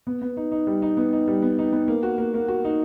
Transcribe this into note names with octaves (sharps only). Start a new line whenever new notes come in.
B3
B3
D#4
D#4
G3
D#4
B3
D#4
G3
B3
D#4
B3
A#3
F#4
A#3
A#3
F#4
D#4